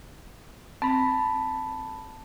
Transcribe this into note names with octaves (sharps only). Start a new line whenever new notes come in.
C4 A5 B5